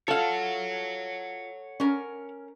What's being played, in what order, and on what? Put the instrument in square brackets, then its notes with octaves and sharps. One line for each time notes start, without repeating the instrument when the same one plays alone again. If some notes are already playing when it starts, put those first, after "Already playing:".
[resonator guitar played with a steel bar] F4 F5 [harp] A4 [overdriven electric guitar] C#5 F#5
[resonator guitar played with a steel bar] C#4 A#4